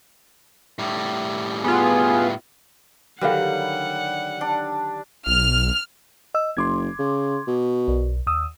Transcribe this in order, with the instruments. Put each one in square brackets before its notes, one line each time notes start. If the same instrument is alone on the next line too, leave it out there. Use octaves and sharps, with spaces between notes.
[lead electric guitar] A2 G3
[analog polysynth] B3 F4 [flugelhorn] G#4
[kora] D3 D#3 F#3 [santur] G3 [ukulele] B4 F5 [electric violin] F#5
[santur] D4
[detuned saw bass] B1 [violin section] F6
[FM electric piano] D#5 E6
[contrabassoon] F#1 [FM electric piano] C6 D6 G#6
[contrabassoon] C#3
B2
[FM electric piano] B1
D#2 D#6 E6